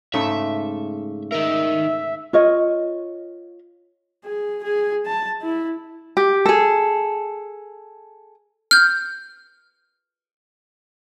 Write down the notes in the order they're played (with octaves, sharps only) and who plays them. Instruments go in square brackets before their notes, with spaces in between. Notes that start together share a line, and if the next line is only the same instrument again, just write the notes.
[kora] G#2 C#3 A3 [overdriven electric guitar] E5
[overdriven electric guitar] D#4 A#4 [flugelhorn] E5
[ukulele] F4 C#5 D#5
[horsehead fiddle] G#4
G#4
A5
E4
[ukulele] G4
G#4 A4
[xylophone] F6 G6